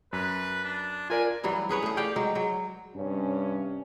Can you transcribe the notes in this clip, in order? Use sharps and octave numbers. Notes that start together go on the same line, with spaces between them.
F#2 B4
D4
F4 A#4 D5 G#5
G2 E3 F#3 G3
C#4 G#4 B4 C#5
A3 G#4
G4 D5 F5 G5
F#3 G#3
F#3
G2 C3 C#4